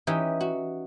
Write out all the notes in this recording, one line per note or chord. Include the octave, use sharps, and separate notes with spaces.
E3 C#4 D#4 G4
F#4